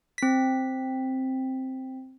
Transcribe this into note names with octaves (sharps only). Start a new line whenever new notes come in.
C4 B6